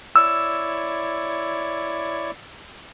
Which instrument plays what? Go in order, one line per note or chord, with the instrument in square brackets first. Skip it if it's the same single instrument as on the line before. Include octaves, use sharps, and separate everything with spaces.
[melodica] E4 C#5 D5 [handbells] E6